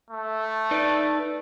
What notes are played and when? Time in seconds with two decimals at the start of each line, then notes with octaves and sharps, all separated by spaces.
0.10 A3
0.71 D#4 B4 D5